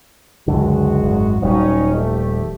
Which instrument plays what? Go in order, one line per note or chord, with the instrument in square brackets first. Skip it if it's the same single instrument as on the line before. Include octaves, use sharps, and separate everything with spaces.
[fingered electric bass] C#2 F#2 D3 [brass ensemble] G#3 F#4
[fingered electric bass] G#1 F#2
[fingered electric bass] D#1 G3 [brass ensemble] F#3 C#4 D#4
[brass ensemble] A#1 A3 G4